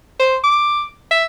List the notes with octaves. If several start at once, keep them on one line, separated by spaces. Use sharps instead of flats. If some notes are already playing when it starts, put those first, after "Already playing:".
C5
D6
E5